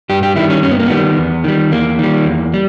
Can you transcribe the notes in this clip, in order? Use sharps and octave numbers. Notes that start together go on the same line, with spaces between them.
G2 G4
G4
D#3 G3 E4
C#4
G2 C#4
B3
A#3
D#3 G3 B3
E2
D#3 G3
E2 A#3
D#3 G3
E2
G3